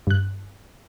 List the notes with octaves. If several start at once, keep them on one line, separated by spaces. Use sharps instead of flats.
G2 F#6